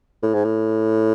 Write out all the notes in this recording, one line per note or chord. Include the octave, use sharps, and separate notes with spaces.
A2
G#2
A2